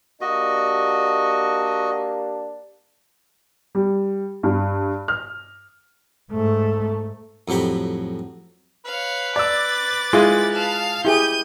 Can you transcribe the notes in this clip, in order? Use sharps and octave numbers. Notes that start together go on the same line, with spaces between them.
A#3 D4 F#4 G4 D#5
G3
G2
F6
G#2 A3
F2 A2 F#3 G4 B5
B4 C#5 F5
D5 D6 E6 A6
G#3 E4 F4 G#5
F5 A5
E4 G4 G#4 G6 D#7